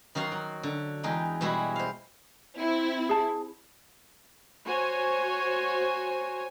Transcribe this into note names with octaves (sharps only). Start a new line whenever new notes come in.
D#3 F#3 F#4 F5 C6
F#3
D3
E2 G#3 D#4 G5
B2 G3 G#3 E4 F#4
C5 F5
C4 E4
G#4 A5
F#4 C5 C#5 G#5